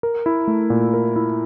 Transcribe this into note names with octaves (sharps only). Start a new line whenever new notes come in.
A#4
E4
A3
A#2
A#4
E4